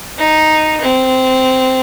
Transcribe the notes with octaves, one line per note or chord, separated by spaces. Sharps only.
D#4
C4